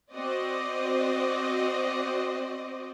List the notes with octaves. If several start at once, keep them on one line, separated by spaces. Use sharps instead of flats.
C4 F#4 C5 D5 D#5